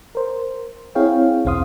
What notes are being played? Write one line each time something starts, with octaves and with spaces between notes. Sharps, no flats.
A#4 C5
C4 E4 G#4 C#5 F5 G5
B1 E2 C4 F5 C6 D#6